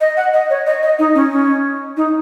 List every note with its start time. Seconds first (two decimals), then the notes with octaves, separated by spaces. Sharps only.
0.01 D#5
0.17 F#5
0.33 D#5
0.50 C#5
0.66 D#5
0.82 D#5
0.99 D#4
1.15 C#4
1.31 C#4
1.97 D#4